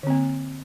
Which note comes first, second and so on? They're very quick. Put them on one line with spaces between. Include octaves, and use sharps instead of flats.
D3 C4 A#3